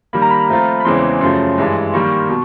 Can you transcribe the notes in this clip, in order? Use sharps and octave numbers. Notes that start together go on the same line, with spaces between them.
D#3 G3 A#3 B5
A#5
B5
F3 A3 C4 F4
B5
E2 C#3 E3 G#3 C4 C6
F#2 C#3 F3 A3 C6
G2 E3 G#3
D#3 G3 A#3 C#6
B2